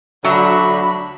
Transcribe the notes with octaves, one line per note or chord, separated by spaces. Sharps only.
D2 D3 F#3 D4 E5 B5